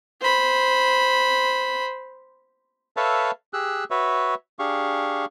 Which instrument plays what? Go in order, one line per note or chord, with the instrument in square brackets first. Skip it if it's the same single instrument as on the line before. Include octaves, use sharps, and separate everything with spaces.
[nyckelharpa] C5 B5
[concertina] A4 B4 C#5 E5 F5 A5
G4 G#4 E6 F#6
F#4 B4 C#5 E5
D4 G4 G#4 F5 C#6